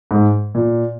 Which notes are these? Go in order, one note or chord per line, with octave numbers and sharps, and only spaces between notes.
G#2
A#2